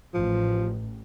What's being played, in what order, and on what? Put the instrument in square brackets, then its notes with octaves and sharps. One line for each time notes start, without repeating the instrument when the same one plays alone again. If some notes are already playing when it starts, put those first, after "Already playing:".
[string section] A1 [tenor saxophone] F3